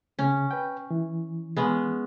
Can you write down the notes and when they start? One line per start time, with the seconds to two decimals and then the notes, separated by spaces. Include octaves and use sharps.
0.19 C#3 C#4
0.51 B4 G5
0.91 E3
1.57 G#3 B3 C#4